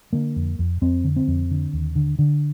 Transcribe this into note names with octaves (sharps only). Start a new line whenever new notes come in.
D3 A#3
F2
F2
F2 C4
D3
C4
F2
D3
D#2
D3
D3